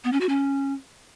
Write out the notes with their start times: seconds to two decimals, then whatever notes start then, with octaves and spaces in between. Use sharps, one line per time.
0.04 B3
0.12 C#4
0.21 F#4
0.29 C#4